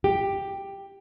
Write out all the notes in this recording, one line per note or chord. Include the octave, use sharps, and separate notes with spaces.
G4